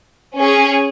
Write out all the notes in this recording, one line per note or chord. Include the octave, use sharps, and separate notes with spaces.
C#4 G#4